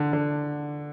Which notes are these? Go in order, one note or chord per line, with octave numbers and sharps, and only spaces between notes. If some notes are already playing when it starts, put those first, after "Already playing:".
Already playing: D3
D3